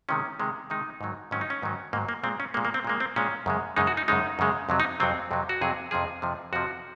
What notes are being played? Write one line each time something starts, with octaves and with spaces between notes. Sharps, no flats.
C3 D#3 G#3 C#4
C3 D#3 G#3
C3 D#3 G#3 D#4
G#2 D#3 F#3
G#2 D#3 F#3 C#4
D#4
C#4
G#2 D#3 F#3
G#2 D#3 F#3 A#3
A#3
A#2 G#3 C4
C#4
A#2 G#3 A#3
A#3
C4
A#2 G#3 A#3
C4
A#2 G#3 C#4
F#2 C#3 G#3
F#2 C#3 G#3 D#4
F#4
D#4
F#2 C#3 G#3 D#4
F#2 C#3 G#3
F2 C3 F#3
D#4
F2 C3 F#3 C4
F2 C3 F#3
F#4
F2 C3 F#3 G#4
F2 C3 F3 G#4
F2 C3 F3
F2 C3 F3 F#4